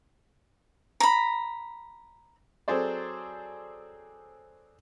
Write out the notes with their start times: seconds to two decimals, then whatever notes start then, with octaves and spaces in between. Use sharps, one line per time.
1.00 A#5 B5
2.68 F#3 C4 G#4 A4 C5 D5